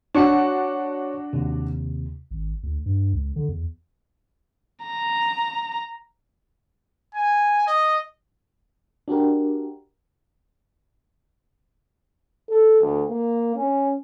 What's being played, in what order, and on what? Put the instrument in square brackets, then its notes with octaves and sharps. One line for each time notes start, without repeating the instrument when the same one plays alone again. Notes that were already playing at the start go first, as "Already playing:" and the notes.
[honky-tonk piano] D4 F#4 [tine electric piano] C#5 C#6 C#7
[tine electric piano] D#2 C3
[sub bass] G#1
D2
G2
C#2
D3
E2
[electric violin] A#5
[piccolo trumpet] G#5
D#5
[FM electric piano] D4 F#4 G4 A#4
[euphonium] A4
D2
A#3
C#4